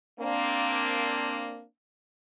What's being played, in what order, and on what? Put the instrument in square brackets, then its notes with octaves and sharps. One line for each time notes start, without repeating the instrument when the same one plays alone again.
[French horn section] A#3 C4 D4